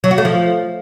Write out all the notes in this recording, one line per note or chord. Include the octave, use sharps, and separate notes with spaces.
F#3
F#4
A3
F3